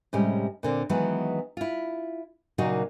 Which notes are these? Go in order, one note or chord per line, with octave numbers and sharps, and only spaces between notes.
A2 C3 G3 G#3 C#4
A#2 D3 C4
D#3 E3 F#3 G#3 B3
E4 F4
A#2 C#3 F#3 A#3 D#4 F#4